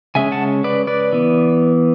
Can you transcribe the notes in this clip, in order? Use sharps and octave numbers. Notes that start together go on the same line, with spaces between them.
C#3 G#3 C#4 E5 G#5
F#5 A5
B4 D5
B4 D5
E3 B3